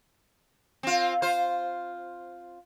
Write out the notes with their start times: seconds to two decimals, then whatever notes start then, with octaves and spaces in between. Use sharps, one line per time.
0.83 C4 F4
1.22 F4 C5